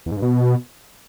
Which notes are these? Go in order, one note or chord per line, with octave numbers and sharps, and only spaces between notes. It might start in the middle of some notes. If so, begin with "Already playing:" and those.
E2
G#2
G2
B2